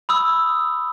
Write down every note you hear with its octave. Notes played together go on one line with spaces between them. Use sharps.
B5 D#6 E6